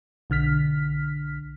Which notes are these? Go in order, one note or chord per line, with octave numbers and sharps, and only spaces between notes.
B1 D3 F6 B6